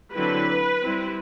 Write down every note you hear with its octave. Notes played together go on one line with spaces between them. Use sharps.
D3 F#3 C4 E4 B4
G3 C4 E4